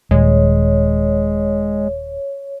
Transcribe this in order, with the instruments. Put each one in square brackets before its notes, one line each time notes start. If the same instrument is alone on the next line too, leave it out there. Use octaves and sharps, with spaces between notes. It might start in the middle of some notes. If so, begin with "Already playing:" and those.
[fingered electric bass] D#1 [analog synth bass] G#3 [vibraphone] C#5